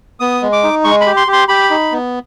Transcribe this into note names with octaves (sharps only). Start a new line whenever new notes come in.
B3 D#6
G#3
D6
D#4
G#3 C#6
B5
G4
C6
G4
C6
G4 B5
D#4
B3